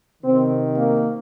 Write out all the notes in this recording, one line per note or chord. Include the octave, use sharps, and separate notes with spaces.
C3 D#3 C4
A#3